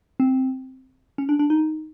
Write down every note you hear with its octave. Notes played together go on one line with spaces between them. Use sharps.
C4
C#4
D4
D4
D#4